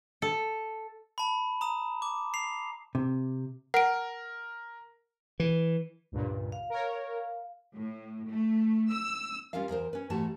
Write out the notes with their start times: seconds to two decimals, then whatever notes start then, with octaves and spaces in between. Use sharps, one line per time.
0.22 A4
1.18 A5 B5
1.61 A#5 D#6 E7
2.02 D6
2.34 C7 F7
2.95 C3
3.74 A#4 F#5 D7
5.40 E3
6.12 C#2 G2 A#2
6.52 F5
6.70 A#4 C#5
7.74 A2
8.27 A3
8.90 E6
9.53 G3 C#4 F4 A#4 F5
9.69 E2 A#4 C5
9.93 C#4 B4
10.10 G#2 E3 A3 F#4 G4 A5